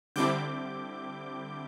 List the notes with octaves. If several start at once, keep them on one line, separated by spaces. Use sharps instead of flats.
D3 G3 C4 E4 D6 G6